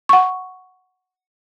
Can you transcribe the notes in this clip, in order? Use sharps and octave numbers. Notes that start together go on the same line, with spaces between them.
F#5 C#6